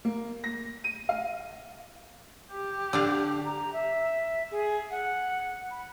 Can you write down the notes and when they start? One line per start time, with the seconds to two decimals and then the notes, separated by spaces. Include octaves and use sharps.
0.05 A#3
0.44 A#6
0.84 D#7
1.09 F5
2.53 G4
2.93 D3 D4 F5
3.45 A#5
3.73 E5
4.51 G#4
4.91 F#5
5.71 B5